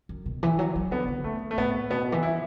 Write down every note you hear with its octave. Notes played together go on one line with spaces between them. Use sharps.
F#2
B2
E3
F#3
F#3
D3 B3
D3
F#2 A3
A3
A2 B3
B2 B3
E3
E4